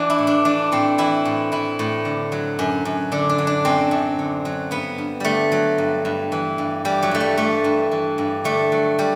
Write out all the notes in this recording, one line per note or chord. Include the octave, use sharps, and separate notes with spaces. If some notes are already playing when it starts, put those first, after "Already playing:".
Already playing: E3 D4
E4
A2
D4
E3 D4
A2 C4
E3 E4
A2
E3 E4
A2
D3
F#3
F#2
F#2
D3 D4
D4
F#3
D4
F#2 C4
F#2
D3
F#3
G2 B3
G2
D3 G3 A3
F#3
G2
G2
E3
G2
E3 G3
F#3
G2 A3
G3
E3 A3
G2
E3
G2
D3 A3
F#3
G3